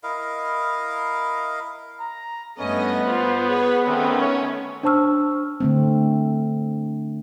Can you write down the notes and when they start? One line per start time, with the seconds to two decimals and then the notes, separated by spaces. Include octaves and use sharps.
0.03 E4 A#4 D#5 F5
2.00 A#5
2.59 G2 A3 B3 C#4 D#5
3.07 F4 C5
3.48 G#4 B4 C#5
3.86 D#3 A3 C4 C#4
4.21 C#5
4.83 D4 C5 A5 C#6 E6 F6
5.60 D3 A3 C4